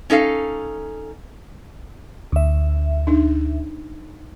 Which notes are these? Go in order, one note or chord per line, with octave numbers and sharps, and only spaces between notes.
C#4 D#4 A4 F5
D2 E5
D4 D#4